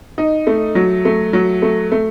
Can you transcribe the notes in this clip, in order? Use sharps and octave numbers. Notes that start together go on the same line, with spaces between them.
D#4
A3
F#3
A3
F#3
A3
A3